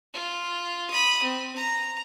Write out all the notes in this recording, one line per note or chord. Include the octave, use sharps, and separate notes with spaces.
F4
B5 D#6
C4
A#5